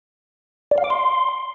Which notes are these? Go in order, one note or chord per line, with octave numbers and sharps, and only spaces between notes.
D5
F5
D6
C6